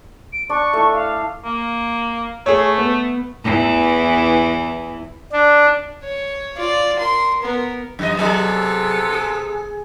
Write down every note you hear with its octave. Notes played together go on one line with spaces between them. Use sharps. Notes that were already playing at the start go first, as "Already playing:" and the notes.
D7
D4 C#6 D#6
A3 E4
F5
A#3
A3 G#4 C#5
B3
E2 E3
D4
C#5
F4 D5
A#4 C6
B3 A#4
F#2 E3 D#5
C3 F#3 B3 G#4 A4 D5
G#4